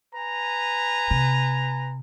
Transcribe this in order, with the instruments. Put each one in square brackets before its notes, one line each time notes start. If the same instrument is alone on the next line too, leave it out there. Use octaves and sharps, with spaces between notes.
[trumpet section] B4 G#5 A#5
[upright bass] C3